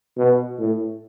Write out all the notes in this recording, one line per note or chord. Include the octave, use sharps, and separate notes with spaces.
B2
A2